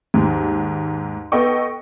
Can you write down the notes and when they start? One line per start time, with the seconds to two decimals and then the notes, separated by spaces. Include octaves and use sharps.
0.14 D#2 G#2
1.32 B3 A4 D#5 G5 C#6